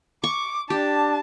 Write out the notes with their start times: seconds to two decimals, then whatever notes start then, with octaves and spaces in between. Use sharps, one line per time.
0.24 C#6 D6
0.70 D4 G4 A5